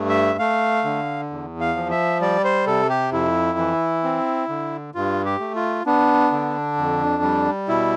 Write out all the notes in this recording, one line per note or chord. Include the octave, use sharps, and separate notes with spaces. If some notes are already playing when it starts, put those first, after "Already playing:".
Already playing: G2 A3
E5
A3 F5
D3
E2
F5
F3
E5
G3 D5
C5
C3 A4
G4
F2 E4
E3
C4
D3
G2 F4
G4
A3
F4
B3 D4
D3
F2
G3
B2 E4